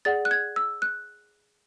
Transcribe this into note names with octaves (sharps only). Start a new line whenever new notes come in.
G#4 D5 F#5 A6
F#6
G#6
E6
F#6